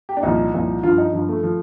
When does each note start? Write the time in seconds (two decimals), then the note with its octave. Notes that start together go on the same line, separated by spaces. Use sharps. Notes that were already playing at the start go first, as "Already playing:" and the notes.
0.09 G4
0.17 D4
0.23 C2 A#2 F3 D#4
0.54 C2 A#2 F3
0.83 G2 F3 F4
0.98 D#4
1.13 G2 F3
1.29 A3
1.43 F3